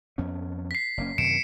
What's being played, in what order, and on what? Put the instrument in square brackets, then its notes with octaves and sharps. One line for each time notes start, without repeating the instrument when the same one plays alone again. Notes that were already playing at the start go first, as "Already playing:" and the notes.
[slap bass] F2 B3 C#4
[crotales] B6 C7
[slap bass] F#1 A#3 C#4
[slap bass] F#2 C3 D#3 [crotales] C#7 D7 E7